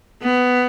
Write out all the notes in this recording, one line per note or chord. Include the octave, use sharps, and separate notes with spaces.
B3